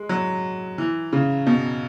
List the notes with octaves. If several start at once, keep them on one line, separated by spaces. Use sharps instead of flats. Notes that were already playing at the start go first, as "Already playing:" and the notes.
Already playing: G#3
F#3
E3
C#3
B2